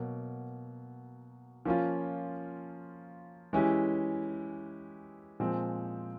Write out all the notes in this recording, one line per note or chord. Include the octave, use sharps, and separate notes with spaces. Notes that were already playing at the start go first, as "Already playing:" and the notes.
Already playing: B2 F#3 A#3
F3 A#3 C#4 F4
E3 G#3 C#4 E4 G4
A#2 F3 G#3 C4